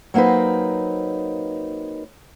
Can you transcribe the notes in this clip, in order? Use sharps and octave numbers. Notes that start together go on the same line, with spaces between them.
F#3 A#3 C4 D#4 B4